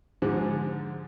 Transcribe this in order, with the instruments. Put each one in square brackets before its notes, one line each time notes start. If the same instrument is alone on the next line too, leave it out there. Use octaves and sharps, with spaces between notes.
[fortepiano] G#2 D3 F3 G#3